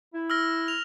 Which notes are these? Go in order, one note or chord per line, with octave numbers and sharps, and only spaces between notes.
E4
E6 F6 A#6
F7